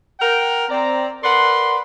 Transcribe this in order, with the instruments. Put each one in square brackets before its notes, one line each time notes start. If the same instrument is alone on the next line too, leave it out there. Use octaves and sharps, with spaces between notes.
[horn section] A#4 F#5 G5
C4 D5 A#5
A#4 B4 D5 F#5 C6